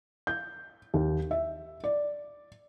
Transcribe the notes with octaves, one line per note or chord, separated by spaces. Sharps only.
G6
D#2
E5
D5